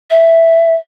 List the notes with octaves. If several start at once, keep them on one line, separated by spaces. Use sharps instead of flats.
E5